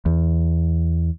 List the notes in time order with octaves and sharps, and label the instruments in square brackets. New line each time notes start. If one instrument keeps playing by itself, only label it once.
[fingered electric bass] E2